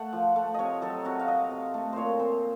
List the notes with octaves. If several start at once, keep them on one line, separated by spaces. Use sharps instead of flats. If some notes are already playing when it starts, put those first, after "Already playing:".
Already playing: A3 F#5
F3
A3
C3 C#5 D#5
F#3 A4
C3 F#4
F5
C3 D#5
C3
A3
A#2 C5 C#5
C4 C5